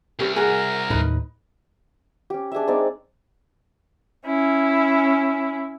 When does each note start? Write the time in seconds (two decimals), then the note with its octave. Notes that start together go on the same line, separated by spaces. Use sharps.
0.19 C2 C#4 G4 B4
0.36 F#4 G#4 A#4
0.90 D#2 A2 D#4 B4 B5
2.30 C#4 G4
2.52 D4 G#4 D#5 E5
2.68 G#3 C4 D#4 D5
4.26 C#4 E4